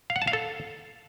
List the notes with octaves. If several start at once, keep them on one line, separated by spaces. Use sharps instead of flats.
F5
F#5
A5
F5
A4